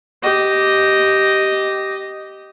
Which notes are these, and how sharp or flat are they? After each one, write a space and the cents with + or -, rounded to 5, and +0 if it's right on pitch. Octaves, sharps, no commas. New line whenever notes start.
G4 -10 D#5 +0